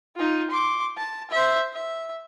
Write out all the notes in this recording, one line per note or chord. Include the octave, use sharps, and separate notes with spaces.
D#4 F4
C6 D6
A5
C5 E5
E5